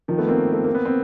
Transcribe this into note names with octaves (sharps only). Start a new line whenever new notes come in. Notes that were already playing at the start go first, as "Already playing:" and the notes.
D#3 F3
A3 B3
A#3 C4
A3
A#3
B3
C4